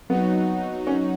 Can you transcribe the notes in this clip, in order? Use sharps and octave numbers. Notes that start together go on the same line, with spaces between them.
F#3 B3 D#4 F#4
C#4